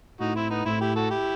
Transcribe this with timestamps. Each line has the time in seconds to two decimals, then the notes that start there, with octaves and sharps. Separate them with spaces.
0.20 A2 D#4 F#4
0.36 C4 E4
0.50 B3 D#4
0.65 A2 C4 E4
0.81 E4 G4
0.96 F#4 A4
1.11 E4 G4